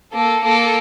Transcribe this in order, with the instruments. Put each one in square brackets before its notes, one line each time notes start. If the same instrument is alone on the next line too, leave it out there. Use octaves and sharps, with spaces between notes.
[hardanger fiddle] A#3 [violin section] A4
[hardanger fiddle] A#3 [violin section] A4